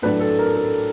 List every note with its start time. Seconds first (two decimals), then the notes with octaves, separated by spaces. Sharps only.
0.02 A2 F#3 A3 D4 B4
0.20 A4
0.39 A#4
0.57 A4